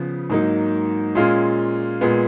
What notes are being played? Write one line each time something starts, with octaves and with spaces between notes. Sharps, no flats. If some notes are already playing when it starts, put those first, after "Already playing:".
Already playing: C#3 F3 B3
G#2 F#3 A#3 D#4
A#2 G#3 C#4 F4
A#2 G#3 B3